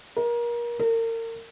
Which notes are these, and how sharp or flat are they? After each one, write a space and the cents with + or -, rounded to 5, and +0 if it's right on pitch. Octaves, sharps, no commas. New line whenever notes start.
A#4 +30
A#4 -35